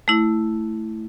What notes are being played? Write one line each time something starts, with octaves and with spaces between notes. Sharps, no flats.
A3 E4